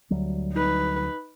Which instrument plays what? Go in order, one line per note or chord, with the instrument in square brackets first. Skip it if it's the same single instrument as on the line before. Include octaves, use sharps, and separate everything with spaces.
[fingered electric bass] D2 F#3 G3
[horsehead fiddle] D#4 B4